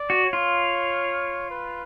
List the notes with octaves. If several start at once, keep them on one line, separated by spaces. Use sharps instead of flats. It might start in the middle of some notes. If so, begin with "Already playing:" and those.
Already playing: D5
F#4
C#5
F4
B4